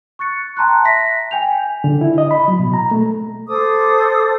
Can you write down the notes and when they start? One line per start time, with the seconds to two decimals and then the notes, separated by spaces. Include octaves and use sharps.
0.19 C#6 F#6 A6 C#7
0.57 G5 A5 A#5 C6 F#6
0.85 E5 A#6 B6
1.31 G5 G#5 G6 F7
1.84 D3
2.01 E4
2.18 D#5
2.31 B5
2.48 F#3
2.59 B2
2.74 A#5
2.91 A3
3.48 A4 C5 D6 D#6